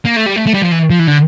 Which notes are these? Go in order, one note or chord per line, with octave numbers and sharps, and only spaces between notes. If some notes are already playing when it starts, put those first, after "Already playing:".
A#3
A3
G3
A3
A3
G3
F3
E3
F3
E3
D3